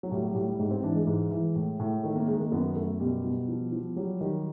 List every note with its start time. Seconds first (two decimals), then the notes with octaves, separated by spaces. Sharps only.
0.03 F#3
0.11 A2 G3
0.23 F#3
0.35 A2 G3
0.48 G3
0.59 G#2 G#3
0.71 C4
0.83 E3 D4
0.95 G#3
1.07 G#2
1.31 E3
1.56 A2
1.80 A2
2.03 D#3 A3
2.16 A#3
2.28 D#3 G#3
2.40 A#3
2.52 F#2 B3
2.76 F#2 A3
3.00 B2 G3
3.25 B2
3.48 F3
3.72 F3
3.96 F#3 G3
4.21 D#3 G3